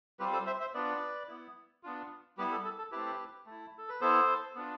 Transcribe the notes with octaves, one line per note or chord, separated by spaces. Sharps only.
G3 C4 F4 G4 B4
A4 C5
C5 E5
C5 E5
B3 D4 F4 B4 D5
B3 E4
B3 D4 F4
G3 B3 E4 G4 B4
A4
A4
A4
A3 C4 E4 G4 B4
A3 E4
A4
B4
B3 E4 A4 C5
B3 D4 F4